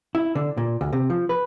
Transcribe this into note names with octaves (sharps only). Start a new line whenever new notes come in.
E4
D3
A#2
D2
C3
F3
B4